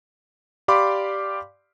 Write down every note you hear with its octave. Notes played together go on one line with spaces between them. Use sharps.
G4 D5 F5 B5 C6 D6